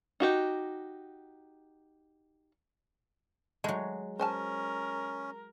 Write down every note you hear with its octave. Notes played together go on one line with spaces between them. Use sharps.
D#4 F#4 G4
F#3 G#3 A3 D#4
C#4 A#4 C5 G#5 A5